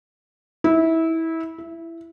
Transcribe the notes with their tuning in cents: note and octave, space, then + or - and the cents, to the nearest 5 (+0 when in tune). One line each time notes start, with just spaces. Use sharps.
E4 -20
E4 +15